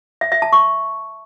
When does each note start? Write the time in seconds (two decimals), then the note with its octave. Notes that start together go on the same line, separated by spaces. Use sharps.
0.21 E5
0.32 E5
0.42 A5
0.53 C#6